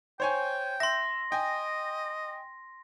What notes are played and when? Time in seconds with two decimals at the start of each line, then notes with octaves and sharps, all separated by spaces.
0.20 C5 C#5 G5 G#5
0.80 E5 C6 A#6
1.32 D#5 G5 G#5